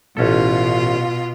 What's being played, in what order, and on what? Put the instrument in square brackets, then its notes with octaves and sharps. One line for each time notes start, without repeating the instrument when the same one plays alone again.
[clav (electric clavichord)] A1 C#4 A4 [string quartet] B2 F4